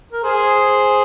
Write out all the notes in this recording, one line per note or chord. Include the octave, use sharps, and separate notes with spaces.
A#4
G#4 C5